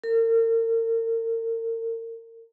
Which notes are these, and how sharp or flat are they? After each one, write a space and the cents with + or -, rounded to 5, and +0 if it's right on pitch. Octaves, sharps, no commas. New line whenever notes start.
A#4 -40